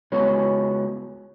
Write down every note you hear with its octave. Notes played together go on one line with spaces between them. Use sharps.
C#2 G#3 B3 F#4 B4 C#5